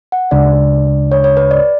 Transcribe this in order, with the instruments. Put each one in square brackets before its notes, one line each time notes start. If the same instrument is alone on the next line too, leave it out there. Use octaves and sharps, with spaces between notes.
[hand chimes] F#5
[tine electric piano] D2 C#3 G#3 D4 [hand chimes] D5
[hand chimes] C#5
C#5
B4
D5